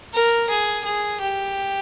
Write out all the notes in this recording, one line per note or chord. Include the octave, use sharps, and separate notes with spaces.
A#4
G#4
G#4
G4